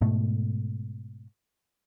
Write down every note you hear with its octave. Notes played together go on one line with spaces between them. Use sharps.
G#2 B2 A3